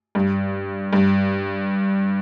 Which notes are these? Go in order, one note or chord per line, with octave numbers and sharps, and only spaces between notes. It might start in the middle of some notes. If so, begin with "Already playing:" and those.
G2
G2